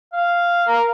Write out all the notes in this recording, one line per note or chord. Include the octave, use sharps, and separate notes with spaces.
F5
A#4